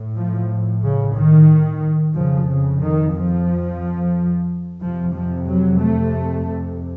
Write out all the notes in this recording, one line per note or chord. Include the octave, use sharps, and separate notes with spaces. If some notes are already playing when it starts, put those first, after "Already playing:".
Already playing: A2
F3
C#3
D#3
F2 C#3 F3
C#3
D#3
F3
F2 C3 F3
F3
F#3
A3